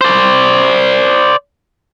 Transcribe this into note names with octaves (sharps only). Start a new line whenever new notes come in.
C5 D5